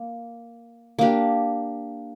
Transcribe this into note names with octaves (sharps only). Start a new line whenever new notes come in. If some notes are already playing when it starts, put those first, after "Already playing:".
Already playing: A#3
A#3 D4 G4